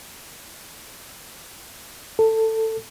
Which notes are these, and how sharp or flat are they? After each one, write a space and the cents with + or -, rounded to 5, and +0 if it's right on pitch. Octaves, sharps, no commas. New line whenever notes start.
A4 +15